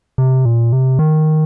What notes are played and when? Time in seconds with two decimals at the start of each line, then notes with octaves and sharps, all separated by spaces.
0.18 C3
0.45 A#2
0.73 C3
0.99 D#3